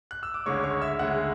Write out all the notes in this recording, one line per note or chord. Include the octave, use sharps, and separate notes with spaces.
F#6
E6
D6
D2 C#3 G#3 C#5 C#6
C#5 C#6
E5 E6
D2 C#3 G#3 F#5 F#6